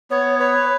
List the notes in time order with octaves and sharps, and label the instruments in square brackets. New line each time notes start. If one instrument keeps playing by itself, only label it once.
[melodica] B3 [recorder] C#5
[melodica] B4 [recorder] C#5